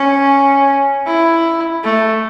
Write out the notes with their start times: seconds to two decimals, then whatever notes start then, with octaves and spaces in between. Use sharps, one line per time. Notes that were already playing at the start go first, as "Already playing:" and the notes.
Already playing: C#4
1.07 E4
1.84 A3